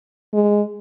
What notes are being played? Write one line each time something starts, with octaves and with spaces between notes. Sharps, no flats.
G#3